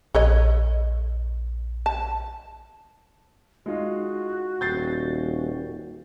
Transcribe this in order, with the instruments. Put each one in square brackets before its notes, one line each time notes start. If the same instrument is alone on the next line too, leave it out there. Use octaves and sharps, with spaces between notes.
[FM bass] A#1 [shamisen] A4 C#5 D#5
[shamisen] A5
[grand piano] G#3 D#4 F4 [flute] F#4
[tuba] D#1 [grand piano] G6 A6 C7